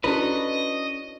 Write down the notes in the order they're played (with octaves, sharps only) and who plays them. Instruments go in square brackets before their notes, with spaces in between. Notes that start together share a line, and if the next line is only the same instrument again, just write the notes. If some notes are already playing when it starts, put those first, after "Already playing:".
[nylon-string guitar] C#4 D4 A4 [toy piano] E4 F#4 [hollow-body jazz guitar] B4 [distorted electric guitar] D#5